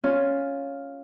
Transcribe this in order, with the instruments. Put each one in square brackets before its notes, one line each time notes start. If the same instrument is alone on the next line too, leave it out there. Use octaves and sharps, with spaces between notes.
[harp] C#4 F4